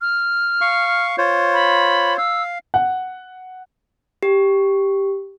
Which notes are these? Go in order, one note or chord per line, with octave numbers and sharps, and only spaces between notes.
F6
F5 C#6
F4 C5 C#5
B5
F5 E6
F#5
G4